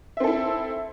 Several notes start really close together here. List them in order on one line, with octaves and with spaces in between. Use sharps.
E5 C4 A4 E4